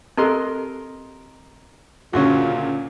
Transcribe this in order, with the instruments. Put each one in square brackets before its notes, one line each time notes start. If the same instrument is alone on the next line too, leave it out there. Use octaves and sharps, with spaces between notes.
[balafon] C4 G4 A4 [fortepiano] A#4 D#5 C6
[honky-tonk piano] D2 A#2 C#3 [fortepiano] C#4 F#4 [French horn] F4